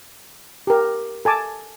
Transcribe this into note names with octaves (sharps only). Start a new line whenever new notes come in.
G4 A#4
A4 G#5 A5 D6